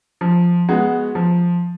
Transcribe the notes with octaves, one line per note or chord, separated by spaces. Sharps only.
F3
G#3 B3 F#4
F3